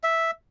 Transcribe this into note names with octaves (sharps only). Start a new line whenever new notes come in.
E5